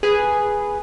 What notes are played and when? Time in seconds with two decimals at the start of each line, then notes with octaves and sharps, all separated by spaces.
0.03 G#4 B4